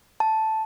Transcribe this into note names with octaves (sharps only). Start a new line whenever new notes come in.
A5